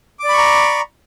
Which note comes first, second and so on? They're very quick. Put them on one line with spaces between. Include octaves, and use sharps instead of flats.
D6 D5 B5 C#6 A#5